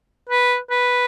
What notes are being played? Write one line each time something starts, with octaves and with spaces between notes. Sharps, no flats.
B4
B4